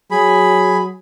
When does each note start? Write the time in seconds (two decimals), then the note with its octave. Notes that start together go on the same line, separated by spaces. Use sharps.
0.11 F#3 G#4 B5